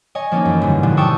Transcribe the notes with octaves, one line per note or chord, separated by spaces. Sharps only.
C#5 D#5 G#5
F3 A#3 C#4 D#4
F#2 E3
G1 G#2
B2 D3 F3
G5 A5 C#6 D#6 E6